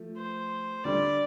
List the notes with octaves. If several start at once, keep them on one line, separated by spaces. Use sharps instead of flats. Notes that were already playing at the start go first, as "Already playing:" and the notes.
Already playing: F3 A3
C5
D3 G3 D5